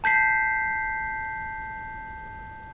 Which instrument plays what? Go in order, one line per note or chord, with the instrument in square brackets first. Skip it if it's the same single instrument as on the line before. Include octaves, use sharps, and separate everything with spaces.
[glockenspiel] A5 G6 B6 C7